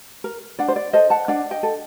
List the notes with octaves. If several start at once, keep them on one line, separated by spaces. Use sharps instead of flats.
A#4
D4 D5 F#5
C5
D5
A4 C5 D#5
F#5 A5
D4 D5 F#5
D#5 G5
A4